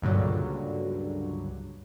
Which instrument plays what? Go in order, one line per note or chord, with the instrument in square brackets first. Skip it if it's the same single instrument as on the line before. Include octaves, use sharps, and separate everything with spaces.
[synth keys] C#2 G2 A#2 D3 F#3